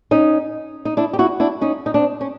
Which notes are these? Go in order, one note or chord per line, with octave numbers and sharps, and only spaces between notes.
C#4 D#4
D#4
D4 E4
G4
E4 F#4
D4 E4
C#4 D#4
D#4
C4 D4
C#4